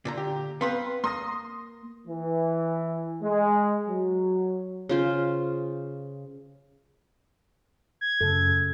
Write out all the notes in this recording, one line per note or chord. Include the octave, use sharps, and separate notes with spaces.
A#2 D3 A#5
G4
B3 C4 B4 F5 C6
A#3 C6 D#6 A#6
E3
G#3
F#3
C#3 F4 C5
G#6
F#2 C#3 A4